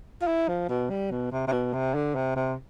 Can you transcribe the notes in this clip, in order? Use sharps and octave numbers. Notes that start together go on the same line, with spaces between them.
F4
E4
F3
B2
G3
B2
C3
C3
B2
C3
D3
C3
C3